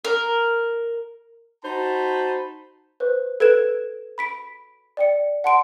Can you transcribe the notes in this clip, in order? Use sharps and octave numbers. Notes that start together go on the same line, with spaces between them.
A#4
D#4 F#4 C5 A5 B5
B4 C5
A4 B4 G#6 D7 E7
B5 B6 D7
D5 G5 C#7
F#5 A5 C6 D7